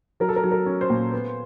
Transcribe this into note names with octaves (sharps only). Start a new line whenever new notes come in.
F#3 A#4
A4
A#4
F#3
A#4
C#4
C5
A#2
B3